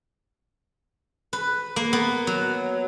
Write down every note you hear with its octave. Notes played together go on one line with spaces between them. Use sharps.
B4
A#3
B3
F#3